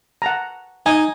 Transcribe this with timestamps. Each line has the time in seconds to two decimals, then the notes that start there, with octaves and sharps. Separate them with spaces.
0.22 F#5 A5 A#5
0.86 D#4 G#5